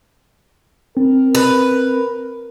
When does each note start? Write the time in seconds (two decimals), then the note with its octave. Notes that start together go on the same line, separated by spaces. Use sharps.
0.97 C4 A#4
1.35 B4